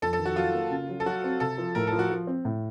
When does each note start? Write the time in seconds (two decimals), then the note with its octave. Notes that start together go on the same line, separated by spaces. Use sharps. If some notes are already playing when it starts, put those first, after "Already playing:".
0.02 F2 A4
0.13 A4
0.19 D#3
0.26 F#4
0.36 F#3 F4
0.54 A#3
0.71 C#3
0.89 F#3
1.00 A4
1.06 F#3 F#4
1.24 C4
1.40 C3 A4
1.58 F3
1.75 A2 A#4
1.87 A4
1.92 F3
1.99 F#4
2.10 F3
2.27 C4
2.45 A2